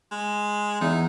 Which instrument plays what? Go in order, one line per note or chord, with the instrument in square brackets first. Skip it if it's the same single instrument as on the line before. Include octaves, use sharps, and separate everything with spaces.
[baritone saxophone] G#3
[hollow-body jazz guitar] E2 [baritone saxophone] D#4